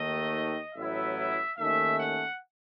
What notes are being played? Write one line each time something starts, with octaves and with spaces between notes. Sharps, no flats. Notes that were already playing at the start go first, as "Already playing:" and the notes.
Already playing: D#2 D#3 A3 D#5
A1 A2 F#3 B3 E4 E5
E5
D#2 D#3 A3 C#4 E5
F#5